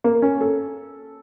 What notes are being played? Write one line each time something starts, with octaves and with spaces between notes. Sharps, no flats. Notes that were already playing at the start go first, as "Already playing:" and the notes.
A#3
C#4
A4